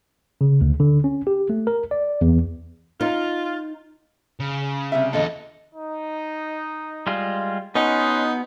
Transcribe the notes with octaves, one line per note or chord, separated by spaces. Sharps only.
C#3
D2
D3
C#4
G4
A3
A#4
D5
E2
D#4 F4
C#3
C3 G3 E5
E2 A#2 D3 A4 D#5
D#4
G3 G#3 F4
B3 C#4 D#4 D#5 F#5 C6